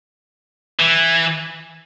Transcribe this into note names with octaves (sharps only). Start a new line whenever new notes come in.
E3